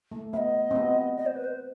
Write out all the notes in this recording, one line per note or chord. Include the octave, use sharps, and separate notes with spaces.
A3
B3 D#5 E5
C4
B3
D#5
C5
B4
C5